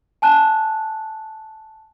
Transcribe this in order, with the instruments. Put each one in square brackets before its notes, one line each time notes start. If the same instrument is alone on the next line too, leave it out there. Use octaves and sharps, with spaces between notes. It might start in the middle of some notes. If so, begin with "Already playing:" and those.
[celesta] G#5 A5 F#6